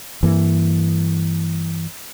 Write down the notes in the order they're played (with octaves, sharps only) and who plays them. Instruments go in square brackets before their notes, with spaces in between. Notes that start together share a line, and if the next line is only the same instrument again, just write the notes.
[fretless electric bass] G2 E3 A#3